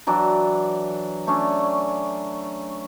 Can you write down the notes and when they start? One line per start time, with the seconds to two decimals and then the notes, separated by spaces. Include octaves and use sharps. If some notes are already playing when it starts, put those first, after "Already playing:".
0.07 E3 F#3 D4
1.27 A3 C#4 D4